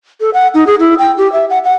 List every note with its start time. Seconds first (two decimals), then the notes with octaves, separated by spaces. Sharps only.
0.21 A4
0.34 F#5
0.54 D#4
0.67 G#4
0.80 E4
0.99 G5
1.18 G4
1.32 E5
1.50 F#5
1.64 F#5